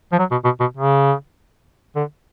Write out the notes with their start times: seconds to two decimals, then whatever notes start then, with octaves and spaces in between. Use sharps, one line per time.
0.12 F3
0.19 F#3
0.31 B2
0.44 B2
0.60 B2
0.77 C#3
1.96 D3